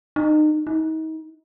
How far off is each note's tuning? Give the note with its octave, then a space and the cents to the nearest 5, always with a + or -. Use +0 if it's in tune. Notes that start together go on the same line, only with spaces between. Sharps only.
D#4 -30
D#4 +35